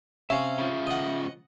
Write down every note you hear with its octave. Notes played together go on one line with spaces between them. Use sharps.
C3 C#4 E5 F5
C#3 F3
D#5 F#5